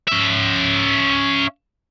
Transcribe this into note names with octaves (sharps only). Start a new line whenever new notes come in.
C#4 E5